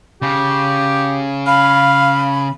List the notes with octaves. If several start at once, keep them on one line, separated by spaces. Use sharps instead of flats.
C#3 G4
F5 B5